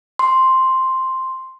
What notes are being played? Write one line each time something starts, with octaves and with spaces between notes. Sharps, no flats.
C6